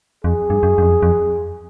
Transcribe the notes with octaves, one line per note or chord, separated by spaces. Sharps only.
F2 G#4
G2
F#2
F#2
F2
F2